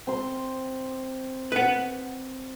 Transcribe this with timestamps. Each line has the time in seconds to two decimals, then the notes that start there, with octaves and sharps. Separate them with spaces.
0.07 C4 C6
1.52 B4 F#5